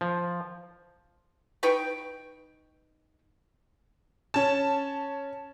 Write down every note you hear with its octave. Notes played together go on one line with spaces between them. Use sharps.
F3
D#4 B4 G5 C#6
C#4 A5